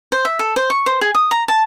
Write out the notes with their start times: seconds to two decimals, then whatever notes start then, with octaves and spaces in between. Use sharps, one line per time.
0.12 C5
0.25 E5
0.39 A4
0.56 C5
0.70 C#6
0.86 C5
1.01 G#4
1.15 D#6
1.31 A#5
1.48 A5